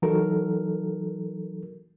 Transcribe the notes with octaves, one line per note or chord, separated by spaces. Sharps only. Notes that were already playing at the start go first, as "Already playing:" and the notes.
E3 F#3 D#4 F#4 A4 A#4